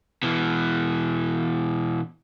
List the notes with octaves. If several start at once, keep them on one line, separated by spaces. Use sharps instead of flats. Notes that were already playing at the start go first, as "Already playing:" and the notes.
B2 E3